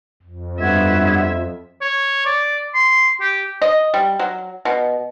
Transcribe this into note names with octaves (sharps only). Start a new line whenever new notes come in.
F2
G2 B3 F4 F#4 E5 G#6
C#5
D5
C6
G4
D#5
G3
F#3
B2